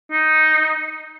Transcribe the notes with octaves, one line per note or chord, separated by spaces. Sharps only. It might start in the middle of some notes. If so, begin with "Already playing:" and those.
D#4